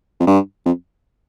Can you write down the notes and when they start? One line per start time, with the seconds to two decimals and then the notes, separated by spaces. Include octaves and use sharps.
0.20 F2
0.27 G2
0.66 F2